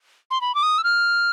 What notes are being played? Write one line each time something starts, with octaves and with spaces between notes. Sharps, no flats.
C6
B5
D6
D#6
E6
F6